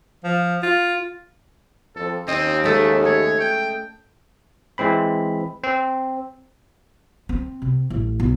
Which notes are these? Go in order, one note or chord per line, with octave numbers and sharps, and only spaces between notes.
F3
F4
F2 A4
D#2 C4 C#4 D#5
G#3 A3 A4 D#5
A3 C#5
G5
E3 G#3 C4 B5
C4
C4
C3
A1
B1